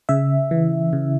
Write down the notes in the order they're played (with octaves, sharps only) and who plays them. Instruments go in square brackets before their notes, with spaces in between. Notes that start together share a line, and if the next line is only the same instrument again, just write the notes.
[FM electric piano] C#3 E5
E3
C#3